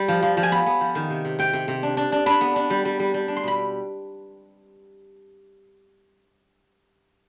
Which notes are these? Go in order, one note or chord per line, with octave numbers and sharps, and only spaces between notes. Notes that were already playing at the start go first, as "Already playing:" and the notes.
Already playing: G3
F3
F3
F3
G#5
B3 B5
B3
F3
D#3
C3
C3
C3 G5
C3
C3
D4
D4
D4
D4 B5
B3
D4
G3
G3
G3
G3
D4
C6
B2 B5